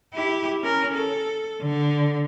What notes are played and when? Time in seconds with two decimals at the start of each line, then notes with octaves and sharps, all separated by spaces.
0.14 E4 G4
0.61 C#4 A#4
0.94 A4
1.62 D3